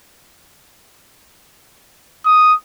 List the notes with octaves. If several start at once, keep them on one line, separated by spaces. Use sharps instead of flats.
D#6